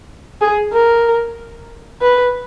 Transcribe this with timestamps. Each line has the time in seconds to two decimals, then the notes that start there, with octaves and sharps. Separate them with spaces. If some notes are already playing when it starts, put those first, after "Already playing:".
0.41 G#4
0.73 A#4
2.02 B4